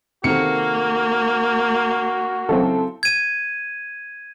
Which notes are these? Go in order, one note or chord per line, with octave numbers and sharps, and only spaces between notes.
C3 D#3 A#3 F#4 A4 C#7
C#3 F#3 C4 E4 A4
G#6 D#7